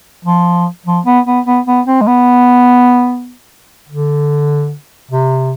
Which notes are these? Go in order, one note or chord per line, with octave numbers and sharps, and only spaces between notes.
F3
F3
B3
B3
B3
B3
C4
G#3
B3
D3
C3